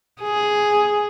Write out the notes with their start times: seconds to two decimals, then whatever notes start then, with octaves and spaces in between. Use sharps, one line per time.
0.22 G#4